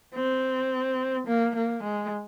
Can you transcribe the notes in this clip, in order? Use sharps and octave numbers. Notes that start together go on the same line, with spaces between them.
C4
A#3
A#3
G#3